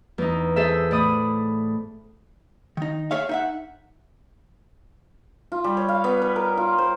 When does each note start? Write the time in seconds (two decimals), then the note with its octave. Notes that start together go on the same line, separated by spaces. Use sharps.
0.18 E2 D#4
0.56 G#4 A4 C5 E5
0.91 A2 D5 B5 D#6
2.77 D#3 D#4
3.11 G#4 C#5 E5 F5
3.29 D#4 E5 F#5
5.52 F4
5.64 G3
5.77 C#5
5.88 F5
6.04 B3
6.22 B4
6.36 A#4
6.57 F4
6.78 C5